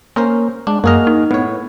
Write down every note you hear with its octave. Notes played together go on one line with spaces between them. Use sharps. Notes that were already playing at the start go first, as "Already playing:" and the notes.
A#3 C#4 A#4 C5
G#3 D4
F#2 A#3 F#4 G#4 D#5 F6
D#4
A2 B3 C#5